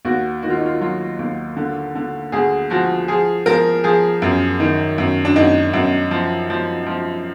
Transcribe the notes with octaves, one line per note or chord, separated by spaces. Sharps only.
D#2 F#4
D#3 F#4
F4
D#4
F4
F#3 F4
D#2
D3
D3
D2 G#4
F3 F#4
F3 G#4
F3 A#4
F3 G#4
F#2
D#3
F#2
D4
F#2 D#4
F#2
F3
F3
F3